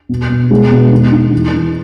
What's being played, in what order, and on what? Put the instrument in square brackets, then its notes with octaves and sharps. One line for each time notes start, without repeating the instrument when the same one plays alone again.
[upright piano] B2
B2
G#3
B2
D#3
D#4
E3
E3